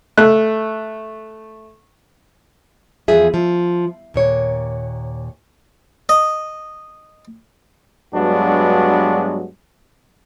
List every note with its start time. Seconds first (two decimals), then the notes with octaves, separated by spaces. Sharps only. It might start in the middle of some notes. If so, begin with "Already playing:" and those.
0.17 A3 F#6
3.08 E2 F3 G#4 E5
3.34 F3
4.14 D#2 A#2 C#5
6.09 D#5
8.14 G2 F#3 G#3 B3 D4 F#4